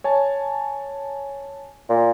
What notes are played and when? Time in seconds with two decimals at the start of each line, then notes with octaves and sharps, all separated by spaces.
0.04 C#5 G#5 A5
1.89 A#2